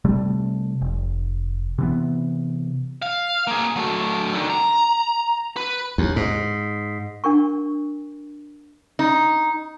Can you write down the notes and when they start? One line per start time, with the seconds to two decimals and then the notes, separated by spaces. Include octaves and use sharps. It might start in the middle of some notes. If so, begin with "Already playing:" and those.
0.05 C3 G3 A3
0.81 F1
1.78 C3 E3 B3
3.02 F5
3.47 A#3 G#4
3.76 F#3 A3
4.33 D3 D#3
4.50 A#5
5.56 B4
5.98 D#2
6.16 G#2
7.24 D4 A#4 C#6
8.99 D#4